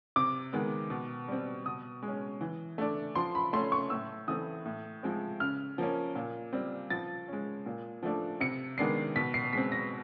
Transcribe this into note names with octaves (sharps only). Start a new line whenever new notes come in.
C3 D6
D#3 G#3 B3
B2
G3 C4
B2 D#6
G#3
C#4
E3
A3 D4
F3 C6
B5
A3 C#4 C6
C#6
A2 E6
E3 A3 C4 D#6
A2
F3 G#3 C4
C#3 F6
F3 A#3 C#4
A#2
G3 C4
F3 A6
G#3 C#4
A#2
F3 A3 D4
C3 C#7
D#3 G#3 B3 D4 C7
B2 B6
C7
G#3 C4 B6
A#6